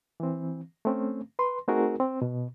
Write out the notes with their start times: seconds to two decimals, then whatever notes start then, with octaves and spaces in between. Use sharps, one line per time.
0.20 E3 C4
0.85 A3 C4 C#4
1.39 B4 C6
1.68 A3 C4 D#4 F#4 G#4 A#4
2.00 C4
2.22 B2